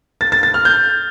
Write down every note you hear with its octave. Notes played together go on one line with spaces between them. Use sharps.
A6
A6
A6
F6
G6